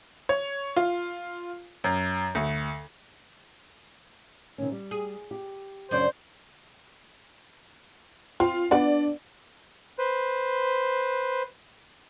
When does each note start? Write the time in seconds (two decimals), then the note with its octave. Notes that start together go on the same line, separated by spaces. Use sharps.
0.29 C#5
0.76 F4
1.84 F#2
2.35 D2
4.58 C3 D#3 C#4
4.72 G3
4.91 G#4
5.31 G4
5.91 F#2 C#3 F#3 D4 C5 D5
8.40 C4 F4
8.71 B3 D4 F#4 B4 D5
9.99 B4 C5